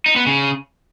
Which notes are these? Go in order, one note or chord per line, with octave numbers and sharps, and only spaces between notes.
D#4
B3
C#3